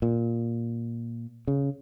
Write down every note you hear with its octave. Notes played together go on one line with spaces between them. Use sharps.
A#2
C#3